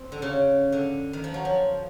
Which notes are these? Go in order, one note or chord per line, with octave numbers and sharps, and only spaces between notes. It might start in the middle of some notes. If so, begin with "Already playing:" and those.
Already playing: C4
D3
C#3
D3
D#3
F3
F#3
F3